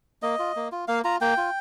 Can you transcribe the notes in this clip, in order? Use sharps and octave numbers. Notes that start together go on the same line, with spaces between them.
A#3 D#5
F4
A#3
F4
A#3 F5
F4 A#5
A#3 G5
F4